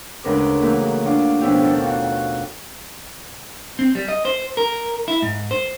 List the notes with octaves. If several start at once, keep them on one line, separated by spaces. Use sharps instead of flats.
D2 C#3 G#3 A#4 B4 D6
E3 F#3 A3 A#3
F#3 D4 F4 D6
B2 F3 C#4 D4 E4 G4
D#2 D#3 A4
F4 F#4
C4
G3
D#5
C5
A#4
E4
G#2
C5